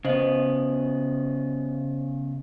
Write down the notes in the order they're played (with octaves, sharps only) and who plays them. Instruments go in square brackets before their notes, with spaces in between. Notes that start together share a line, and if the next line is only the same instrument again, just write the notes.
[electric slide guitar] C#3 B3 [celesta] C5 D#5 F#7